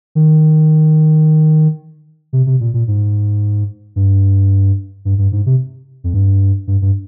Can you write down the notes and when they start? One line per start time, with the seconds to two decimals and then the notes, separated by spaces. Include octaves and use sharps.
0.15 D#3
2.33 C3
2.46 C3
2.60 A#2
2.74 A#2
2.87 G#2
3.96 G2
5.05 G2
5.18 G2
5.32 G#2
5.46 C3
6.04 F2
6.14 G2
6.67 G2
6.82 G2